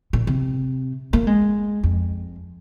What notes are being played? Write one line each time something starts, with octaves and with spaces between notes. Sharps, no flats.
A#2
C3
A#3
G#3
F2